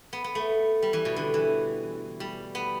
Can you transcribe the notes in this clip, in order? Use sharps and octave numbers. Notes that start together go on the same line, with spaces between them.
B3
B3
A3
G3
E3
B2
D3
E3
G3
B3